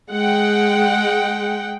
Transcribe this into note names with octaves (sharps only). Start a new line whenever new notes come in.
G#3 F#5 G5